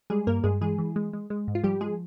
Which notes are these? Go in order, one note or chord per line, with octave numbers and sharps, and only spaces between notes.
G3 G#3 G#4
G2 A#3 A#4
G2 G#3 G#4
E3 G#3 G#4
E3
G#3
G#3
G#3
G#2
F4
F3 G3 G4
F3 G#3 G#4